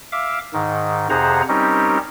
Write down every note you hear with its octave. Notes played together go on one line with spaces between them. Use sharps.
E5 F5 D6
G#2 D#3
F2 C3 G#4 C5 F#5 A#5
G3 C4 C#4 D#4 G4 A#4